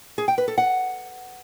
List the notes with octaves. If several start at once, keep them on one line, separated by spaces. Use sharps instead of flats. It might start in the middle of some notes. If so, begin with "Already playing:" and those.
G#4
G5
B4
A4
F#5